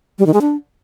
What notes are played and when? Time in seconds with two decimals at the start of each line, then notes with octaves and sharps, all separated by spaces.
0.19 G3
0.26 D#3
0.34 G#3
0.41 D4